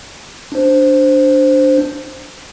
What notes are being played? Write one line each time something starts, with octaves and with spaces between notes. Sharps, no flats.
D4 C5